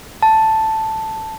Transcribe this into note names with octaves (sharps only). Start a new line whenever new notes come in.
A5